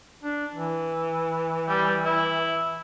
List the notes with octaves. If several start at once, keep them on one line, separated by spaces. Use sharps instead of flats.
D4
E3
G3
E4